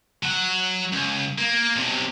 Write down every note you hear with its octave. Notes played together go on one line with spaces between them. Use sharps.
F#3 F#5
C#2
A#3
B1 C3